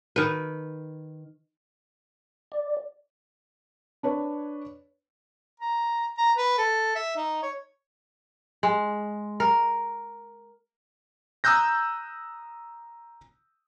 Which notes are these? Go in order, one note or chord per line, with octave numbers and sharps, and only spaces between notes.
D#3 B4
D5
D4 B4 C#5
A#5
A#5
B4
A4
E5
D#4
C#5
G#3
A#4
A#5 D#6 E6 F#6 G6 A#6